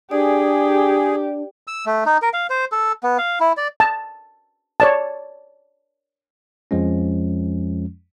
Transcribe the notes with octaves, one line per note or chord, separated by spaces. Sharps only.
D4 G4 G#4 D5
E6
A3
D#4
A#4
F5
C5
A4
B3
F5
E4
D5
A5
C#5 D5 A5
F2 F3 G#3 C#4